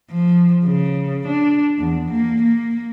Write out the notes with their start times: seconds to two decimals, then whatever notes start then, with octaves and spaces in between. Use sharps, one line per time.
0.10 F3
0.65 C#3
1.28 D4
1.80 E2
2.12 A#3
2.43 A#3